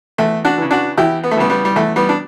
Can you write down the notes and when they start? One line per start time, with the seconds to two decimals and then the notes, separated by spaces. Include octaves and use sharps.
0.18 E2 A3
0.45 D4 F#4
0.58 C#3 E3
0.71 D4 F#4
0.97 E2 E4 G4
1.24 B3
1.31 A3
1.36 C#3 E3 G3 B3
1.50 G3 B3
1.65 G3
1.76 E2 A3
1.96 G3 B3
2.09 D4